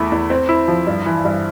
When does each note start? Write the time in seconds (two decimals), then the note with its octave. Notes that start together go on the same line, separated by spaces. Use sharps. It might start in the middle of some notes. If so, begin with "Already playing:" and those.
Already playing: E2 A3 E4
0.12 E2
0.30 C4
0.49 E4
0.68 F3
0.87 G2
1.06 E3
1.25 G2